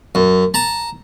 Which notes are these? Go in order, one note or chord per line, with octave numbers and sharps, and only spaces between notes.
F#2
A5 A#5